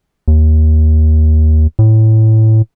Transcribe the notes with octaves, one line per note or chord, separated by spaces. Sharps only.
D#2
A2